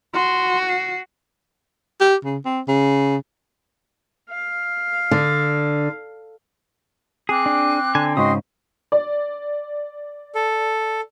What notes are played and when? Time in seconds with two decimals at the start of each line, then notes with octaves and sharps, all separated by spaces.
0.14 F#4 C6
0.69 C7
2.00 G4
2.25 C#3
2.45 C4
2.68 C#3
4.30 F5
5.11 D3
7.29 C4 G#4 D6 F#6
7.46 D4
7.95 D3 G#5
8.17 G#2 C#3 F#4 D#5 C6 D#6
8.92 D5
10.35 A4